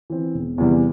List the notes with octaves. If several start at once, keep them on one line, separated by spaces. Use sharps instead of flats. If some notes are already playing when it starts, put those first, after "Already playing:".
E3 C4
E1
E2 C3 E3 G3